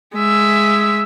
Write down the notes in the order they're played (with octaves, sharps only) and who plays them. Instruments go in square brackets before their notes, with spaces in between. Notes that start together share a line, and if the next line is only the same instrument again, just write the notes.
[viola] G#3 E5